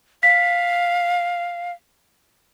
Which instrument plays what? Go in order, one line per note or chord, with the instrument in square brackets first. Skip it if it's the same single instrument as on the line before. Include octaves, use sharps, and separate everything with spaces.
[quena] F5 [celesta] B6